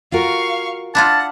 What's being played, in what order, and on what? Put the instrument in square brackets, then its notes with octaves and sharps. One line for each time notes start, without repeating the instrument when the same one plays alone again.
[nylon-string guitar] F4 F#4 A#4 [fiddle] F5 C#6
[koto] D4 E4 F4 [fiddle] F#5 [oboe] A5